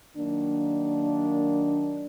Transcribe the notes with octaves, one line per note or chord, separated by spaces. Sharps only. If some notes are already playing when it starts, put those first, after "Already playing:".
D#3 F#3 A#3 D4